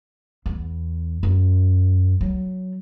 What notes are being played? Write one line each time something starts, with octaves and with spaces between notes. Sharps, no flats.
E2
F#2
F#3